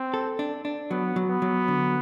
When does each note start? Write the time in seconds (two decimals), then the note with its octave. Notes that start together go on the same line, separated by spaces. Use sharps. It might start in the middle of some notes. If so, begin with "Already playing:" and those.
Already playing: C4
0.14 A4
0.39 D4
0.65 D4
0.91 F#3 B3
1.16 F#3
1.29 B3
1.42 F#3
1.68 D3